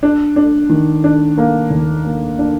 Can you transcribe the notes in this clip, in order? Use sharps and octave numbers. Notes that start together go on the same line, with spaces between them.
D4
D4
D#3
D4
A#3
D#2
A#3
D4